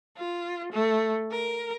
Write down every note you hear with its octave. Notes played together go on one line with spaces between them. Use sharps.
F4
A3
A#4